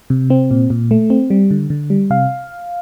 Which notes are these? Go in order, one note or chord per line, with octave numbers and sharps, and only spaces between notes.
C3
C4
A#2
A#2
A3
C4
G3
D3
D3
G3
C3 F5